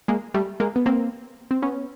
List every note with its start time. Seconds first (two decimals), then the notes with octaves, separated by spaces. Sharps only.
0.08 G#3 A#3
0.34 G3 A3
0.60 G#3 A#3
0.76 B3
0.86 A#3 C4
1.51 C4
1.62 B3 C#4